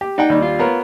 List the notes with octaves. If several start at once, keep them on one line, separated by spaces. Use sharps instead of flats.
G4
D#4 D5 F#5 G5
D#2 G3 D4
F4
B3 A#4 C#5